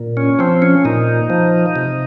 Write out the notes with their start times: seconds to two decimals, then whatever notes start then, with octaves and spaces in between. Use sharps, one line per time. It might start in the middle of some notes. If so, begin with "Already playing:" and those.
Already playing: A#2
0.17 C#4
0.39 F3 C4
0.62 C#4
0.85 A#2 D#4
1.30 F3
1.76 C3